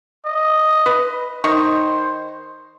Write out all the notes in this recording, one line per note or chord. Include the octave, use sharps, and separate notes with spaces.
D#5
B4
D#3 C5 D#5 C#6